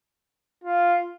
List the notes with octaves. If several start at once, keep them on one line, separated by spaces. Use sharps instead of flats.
F4